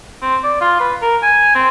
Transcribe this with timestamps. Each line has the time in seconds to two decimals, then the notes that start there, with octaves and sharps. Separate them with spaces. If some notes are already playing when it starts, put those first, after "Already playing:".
0.22 C4
0.44 D5
0.61 F4
0.80 B4
1.02 A#4
1.23 G#5
1.55 C4